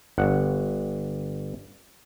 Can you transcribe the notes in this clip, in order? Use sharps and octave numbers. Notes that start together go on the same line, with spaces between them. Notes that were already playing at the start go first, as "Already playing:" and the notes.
G1 F#5